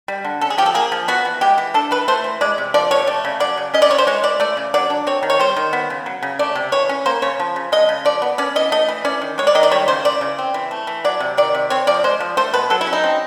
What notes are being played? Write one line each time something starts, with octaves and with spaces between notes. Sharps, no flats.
G3
D3
C#4 A4
G#4
F3 G4
A4
A#3 G#4
F3
B3 F#4
E3
G#3 G4
E3
D4 A4
E3 B4
A3 C5
E3
G#3 D5
C3
F3 D5
C3 C#5
A3 D5
C#3
F#3 D5
C#3
C#4 D#5
D5
E3 C#5
C5
G#3 C#5
E3 D5
A3 D5
C#3
F#3 D5
D4
C4 C#5
D#3
C#5
G3 C5
D#3
B3
C#3
F#3
C#3
A3 D5
C3
E3 C#5
C#4
A#3 C5
C#3 C#5
F3
C#3
G#3 D#5
C#3
F3 D5
B3
C#4 D5
E3 D#5
A3 D#5
E3
C#4 D5
D#3
G#3 C#5
D5
D#3 D#5
D5
G3 C#5
C#3 C5
E3 D5
C#3
C4
E3
A3
E3
F#3 D5
C3
D#3 D5
C3
C4 C#5
F3 D5
G#3 C5
F3
A3 C5
B2 B4
F#3 A4
E4
C#4
D#4
C4